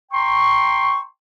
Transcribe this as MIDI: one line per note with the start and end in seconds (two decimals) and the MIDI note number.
0.12 1.00 79
0.12 1.00 82
0.12 1.00 84
0.12 1.00 85